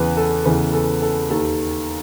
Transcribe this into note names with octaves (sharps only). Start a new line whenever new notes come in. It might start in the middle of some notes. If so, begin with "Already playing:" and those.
Already playing: E2 C#3 E3 B4
A4
E2 C#3 E3 B4
A4
A4
D#2 D#3 A4